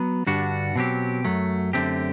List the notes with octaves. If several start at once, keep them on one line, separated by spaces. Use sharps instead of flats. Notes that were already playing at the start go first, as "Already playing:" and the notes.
Already playing: F#3 B3
G2 D3 G3 D4 F#4
B2 F#3 C4 G4
F#2 F#3 A3
F#2 D3 A3 C4 G4